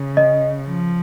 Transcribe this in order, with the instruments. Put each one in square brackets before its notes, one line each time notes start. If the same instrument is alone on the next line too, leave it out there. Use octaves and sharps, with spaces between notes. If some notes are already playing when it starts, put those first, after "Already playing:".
Already playing: [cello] C#3
[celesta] D#5
[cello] F3